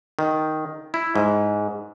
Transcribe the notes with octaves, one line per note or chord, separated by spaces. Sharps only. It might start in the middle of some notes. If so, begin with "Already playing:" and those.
D#3
E4
G#2